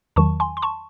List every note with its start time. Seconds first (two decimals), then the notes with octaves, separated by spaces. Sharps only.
0.16 E2 D#3 F#3 A5 C#6
0.40 G#5 C6
0.57 C6
0.62 A5 C#6